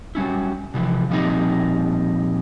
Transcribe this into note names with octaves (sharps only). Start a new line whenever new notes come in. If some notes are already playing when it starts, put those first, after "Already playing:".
F#3 G3 C#4 E4
C3 E3 F3
A#2 F3 G3 C4 D#4